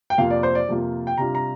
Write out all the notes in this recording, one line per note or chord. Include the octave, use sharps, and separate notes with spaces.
G5
F2 C3 A#3 F4 F5
D5
C5
D5
F2 C3 A#3 F4
G5
C3 G3 D4 F4 A#5
A#5